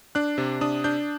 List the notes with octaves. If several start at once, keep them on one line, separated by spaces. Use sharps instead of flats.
D4 F#6
C3
D4 D#6
D4 G6